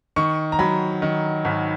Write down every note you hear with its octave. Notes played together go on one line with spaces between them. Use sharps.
D#3 C#6
A#5
F#3 B5
D#3
G#1